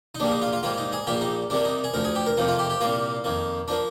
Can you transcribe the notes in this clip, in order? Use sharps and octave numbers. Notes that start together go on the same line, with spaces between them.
D#4
A#1 A#2 G3 A#3 D4
D#4
F4
F4
G#2 G3 A#3 F4
D#4
G#4
A#1 A#2 G3 A#3 G4
D#4
C2 C3 G3 A#3 D4
D#4
G#4
D2 D3 F3 A#4
G#4
G4
A#4
F2 C3 F3 A#3 D#4
F4
G4
G4
C2 A#2 G3 A#3 F4
F2 D#3 A#3
F3 A#3 D4